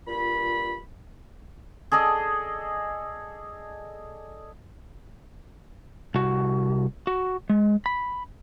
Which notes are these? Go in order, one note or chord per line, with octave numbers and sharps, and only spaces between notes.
G2 A#2 F4 B5
G#4 A4 D5 D#5
C2 F#4
F#4
G#3
B5